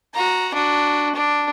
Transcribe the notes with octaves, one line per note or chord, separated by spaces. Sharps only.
F#4 A#5
D4 F#4
D4